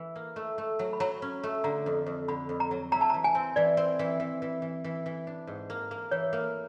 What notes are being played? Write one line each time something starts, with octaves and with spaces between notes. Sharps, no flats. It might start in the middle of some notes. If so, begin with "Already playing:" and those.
Already playing: E3
A#3
A3
A3
F#3
B5
F#3 A#5
C#4
A3
D3 A#5
F2
F2
D3 B5
F2
A#5
F#3
E4 A#5
A5
E3 A#5
G#5
C4
E3 D5
C4
E3
E3
E3
E3
E3
E3
D4
G#2
A#3
A#3
E3 C#5
A#3